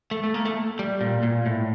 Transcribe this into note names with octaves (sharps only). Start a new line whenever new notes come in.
A3
A3
A#3
A3
G3
A#2
A#2
A2